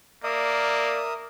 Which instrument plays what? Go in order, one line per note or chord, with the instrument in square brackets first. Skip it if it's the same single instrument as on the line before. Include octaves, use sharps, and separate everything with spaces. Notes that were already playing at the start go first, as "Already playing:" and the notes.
[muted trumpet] A#3 [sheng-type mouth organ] A#4 E5 D#6 [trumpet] D5